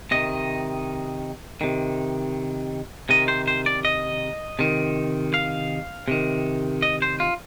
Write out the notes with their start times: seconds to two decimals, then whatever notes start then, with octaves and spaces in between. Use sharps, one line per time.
0.11 C3 D#3 D#5
1.61 C3 D#3
3.09 C3 D#3 D#5
3.28 C5
3.47 C5
3.66 D5
3.85 D#5
4.59 C3 D#3
5.34 F5
6.08 C3 D#3
6.82 D#5
7.02 C5
7.20 F4